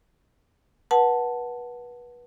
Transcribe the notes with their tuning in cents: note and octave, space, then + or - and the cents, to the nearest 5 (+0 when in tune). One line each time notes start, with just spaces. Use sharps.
B4 -25 F#5 +0 A5 +0